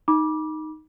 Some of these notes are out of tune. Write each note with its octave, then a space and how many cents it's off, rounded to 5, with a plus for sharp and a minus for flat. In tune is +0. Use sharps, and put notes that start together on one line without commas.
D#4 +0 B5 -35 D6 +0